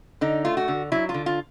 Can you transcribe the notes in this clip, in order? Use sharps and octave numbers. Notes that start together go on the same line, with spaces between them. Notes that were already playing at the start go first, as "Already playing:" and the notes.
D3 D#4
A3 F4
F#4
D3
F#3 E4
F4
D3
F4